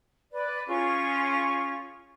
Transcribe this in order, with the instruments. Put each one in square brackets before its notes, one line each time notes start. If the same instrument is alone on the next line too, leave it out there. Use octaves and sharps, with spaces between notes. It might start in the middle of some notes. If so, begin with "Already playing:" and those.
[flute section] B4 D5
C#4 F4 G#4 C#6